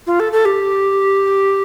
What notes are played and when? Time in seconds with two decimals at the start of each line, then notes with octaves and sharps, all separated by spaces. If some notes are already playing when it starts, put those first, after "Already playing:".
0.07 F4
0.20 A4
0.33 A4
0.45 G4